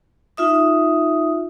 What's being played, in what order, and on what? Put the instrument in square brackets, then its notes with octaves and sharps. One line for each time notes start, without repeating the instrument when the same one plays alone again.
[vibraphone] D#4 F4 E5 D#6